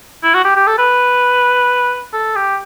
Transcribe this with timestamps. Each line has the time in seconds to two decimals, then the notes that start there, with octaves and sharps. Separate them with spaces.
0.23 E4
0.34 F#4
0.45 G4
0.56 G4
0.67 A4
0.78 B4
2.14 A4
2.36 G4